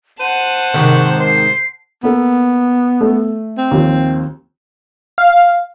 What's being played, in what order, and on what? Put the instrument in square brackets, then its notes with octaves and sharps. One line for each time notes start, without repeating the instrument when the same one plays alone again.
[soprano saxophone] C5 [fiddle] F#5 A5 [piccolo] D#7
[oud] G#2 C3 D#3 [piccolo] C#6
[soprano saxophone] C5 [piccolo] C7
[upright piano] A#3 A4 [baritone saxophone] B3
[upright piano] A3 A4
[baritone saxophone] C4
[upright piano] D#2 F3
[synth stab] F5